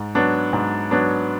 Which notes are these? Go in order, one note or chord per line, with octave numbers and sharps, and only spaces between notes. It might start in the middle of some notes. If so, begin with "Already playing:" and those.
Already playing: G#2
F#3 B3 D4
G#2
F#3 B3 D4